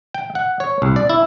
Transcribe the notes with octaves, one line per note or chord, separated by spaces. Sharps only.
G5
F#5
C#5
C2
D5
E4